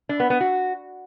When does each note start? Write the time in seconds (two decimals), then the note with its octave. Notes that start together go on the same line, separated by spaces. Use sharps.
0.09 D4
0.20 B3
0.30 B3
0.41 F#4